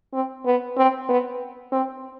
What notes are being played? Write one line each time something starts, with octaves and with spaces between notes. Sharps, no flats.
C4
B3
C4
B3
C4